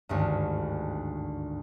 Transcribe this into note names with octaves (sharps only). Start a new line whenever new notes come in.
G#1 D2 G2